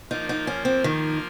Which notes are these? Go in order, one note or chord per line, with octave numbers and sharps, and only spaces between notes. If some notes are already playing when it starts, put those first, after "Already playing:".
F3 A#3 D#4 F4 A#4
D#4
C#4
C4
D#3